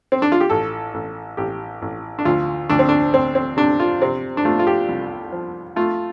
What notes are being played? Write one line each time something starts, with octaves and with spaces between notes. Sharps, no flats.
C4
D4
F4
G4
A1 A4
A1
A1 G4
A1
D4
D2 F4
D2 D4
C4
D4
D2 C4
C4
C3 D4
F4
C3 C4
D4
A3 F4
F4
G4
C2
F3
A3 F4